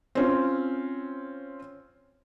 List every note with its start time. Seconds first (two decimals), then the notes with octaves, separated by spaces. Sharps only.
0.15 C4 C#4 F4